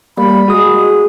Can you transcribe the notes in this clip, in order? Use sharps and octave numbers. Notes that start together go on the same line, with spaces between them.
G3 A#3 B5
G#3 F#4 D#6